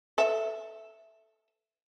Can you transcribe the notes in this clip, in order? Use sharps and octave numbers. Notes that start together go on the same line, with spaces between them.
A4 E5